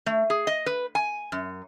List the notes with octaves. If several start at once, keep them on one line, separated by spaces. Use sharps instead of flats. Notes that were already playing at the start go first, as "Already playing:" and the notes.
A3
G#4
D#5
B4
G#5
F#2